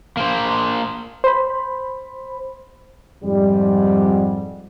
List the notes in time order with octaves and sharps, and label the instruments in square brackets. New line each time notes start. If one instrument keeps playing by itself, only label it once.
[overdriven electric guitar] A#3 C5
[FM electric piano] C5 B5
[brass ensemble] F2 G#2 G3